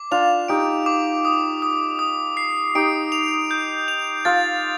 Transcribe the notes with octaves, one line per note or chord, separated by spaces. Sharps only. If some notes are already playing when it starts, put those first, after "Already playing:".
Already playing: D6
D4 F4 F7
D#4 G4 D7
D6
D#6
D#6
D#6
C7
D#4 G4 D7
F7
G6
F7
F4 A4 A6